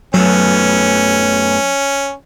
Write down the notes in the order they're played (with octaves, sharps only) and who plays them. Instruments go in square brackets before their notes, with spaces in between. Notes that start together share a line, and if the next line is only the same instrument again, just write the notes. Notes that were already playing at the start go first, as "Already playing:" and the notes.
[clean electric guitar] F#2 A3 B3 [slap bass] F#3 [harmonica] C#4